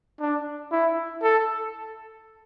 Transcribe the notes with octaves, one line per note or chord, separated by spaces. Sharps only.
D4
E4
A4